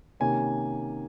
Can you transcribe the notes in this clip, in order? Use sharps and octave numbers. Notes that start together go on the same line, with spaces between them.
C3 D#3 A#3 C#4 G#5